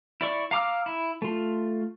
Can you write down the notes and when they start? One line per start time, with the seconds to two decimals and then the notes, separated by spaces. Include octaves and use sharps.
0.21 E4 D5 C#6
0.51 F5 A#5 D6 E6 F6
0.86 E4
1.22 A3 F4